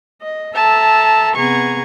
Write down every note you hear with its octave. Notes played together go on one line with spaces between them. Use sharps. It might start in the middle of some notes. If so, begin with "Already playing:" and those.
D#5
A4 E5 A5 A#5
C3 B3 G#4 A#5 C#6 G#6